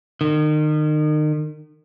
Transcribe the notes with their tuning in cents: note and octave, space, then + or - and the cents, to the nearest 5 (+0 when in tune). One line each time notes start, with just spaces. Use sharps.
D#3 -35